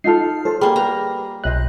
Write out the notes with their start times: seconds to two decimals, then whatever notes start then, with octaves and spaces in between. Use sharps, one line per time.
0.04 D#4 F4 A4 F6 C7
0.45 A4 C5 A5
0.61 G3 A#3 G#4 C5
0.76 G4 B4 A#5
1.44 B1 C5 D#5 E5 F#6